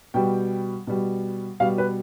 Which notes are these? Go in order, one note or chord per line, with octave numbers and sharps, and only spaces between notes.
B2 G3 G5
B2 G3
B2 G3 F5
B4